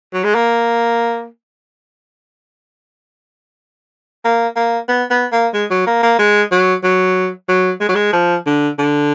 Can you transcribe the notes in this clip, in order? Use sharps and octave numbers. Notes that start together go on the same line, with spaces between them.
F#3
G#3
A#3
A#3
A#3
B3
B3
A#3
G#3
F#3
A#3
A#3
G#3
F#3
F#3
F#3
G#3
F#3
G#3
F3
D3
D3